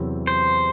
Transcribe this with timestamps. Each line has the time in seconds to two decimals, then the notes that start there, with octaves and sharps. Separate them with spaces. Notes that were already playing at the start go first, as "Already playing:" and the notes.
Already playing: E2 C3 F#3 C4 E4
0.27 C5